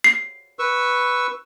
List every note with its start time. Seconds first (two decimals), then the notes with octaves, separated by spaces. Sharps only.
0.04 C7
0.59 B4 C#6 E6